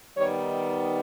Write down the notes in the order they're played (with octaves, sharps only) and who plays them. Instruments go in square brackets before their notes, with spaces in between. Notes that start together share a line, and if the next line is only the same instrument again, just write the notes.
[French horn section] D#3 G3 B3 D#4 C#5